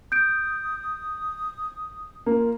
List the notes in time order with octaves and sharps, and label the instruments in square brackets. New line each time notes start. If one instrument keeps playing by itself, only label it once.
[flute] D#6 [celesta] G6 D7
[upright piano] A#3 [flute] F4